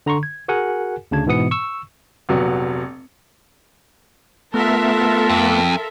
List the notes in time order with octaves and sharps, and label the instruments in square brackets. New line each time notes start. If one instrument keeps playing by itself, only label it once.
[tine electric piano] D3 A#5 C6 C#6
G#6
F#4 G#4 A#4 F#5 G#5
D2 C#3 D4 A5 G#6
G#2 B2 E3 B3 D#6 C#7
C#6 E6
[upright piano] F1 A#1 F#3 B3 F#4
[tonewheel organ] A3 B3 [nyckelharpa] F4 A5 [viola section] A4 A#4 E5
[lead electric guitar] F2